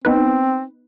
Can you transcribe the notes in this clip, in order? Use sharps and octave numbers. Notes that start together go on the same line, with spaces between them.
B3 C4 D#4 B4